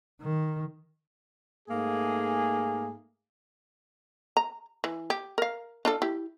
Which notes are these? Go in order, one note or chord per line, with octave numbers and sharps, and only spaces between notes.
D#3
G#2 A3 A#3 G#4
A#5
E3
G4
A#4 F5
D4 F4 A4
E4 G4